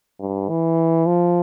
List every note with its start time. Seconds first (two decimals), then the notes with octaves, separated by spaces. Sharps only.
0.20 G2
0.49 E3
1.06 F3